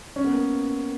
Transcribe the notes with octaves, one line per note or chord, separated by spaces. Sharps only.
C#4
B3
A#3